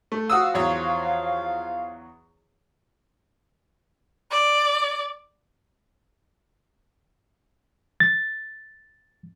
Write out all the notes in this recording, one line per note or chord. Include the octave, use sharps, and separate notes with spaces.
A3
F3 F4 F#4 F5 D#6 E6
E2 F#3 C#5
D5
A6